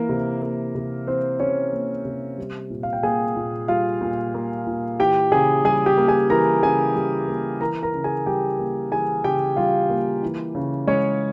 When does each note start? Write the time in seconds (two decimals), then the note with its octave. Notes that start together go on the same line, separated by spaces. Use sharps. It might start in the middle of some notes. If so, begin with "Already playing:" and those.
Already playing: E3 A#3 A#4
0.09 C3
0.42 A#3
0.75 C3
1.07 E3 C4 C5
1.40 C3 C#4 C#5
1.73 A#3
2.05 C3
2.38 G3
2.70 A#2
2.83 F5
2.93 G5
3.03 A#3 G#4 G#5
3.36 A#2
3.68 G3 F4 F5
4.01 A#2
4.34 A#3
4.67 A#2
4.99 E3 G4 G5
5.32 C#3 G#4 G#5
5.65 G3 G#4 G#5
5.86 G4 G5
5.97 A#3
6.08 G#4 G#5
6.30 E3 A#4 A#5
6.63 C#3 G#4 G#5
6.96 G3
7.28 A#3
7.60 E3 A#4 A#5
7.83 A#4 A#5
7.94 C#3
8.04 G#4 G#5
8.26 G3 G4 G5
8.59 A#3
8.91 E3 G#4 G#5
9.24 C#3 G4 G5
9.56 G3 F4 F5
9.90 A#3
10.22 E3
10.55 C#3
10.87 G#3 C#4 C#5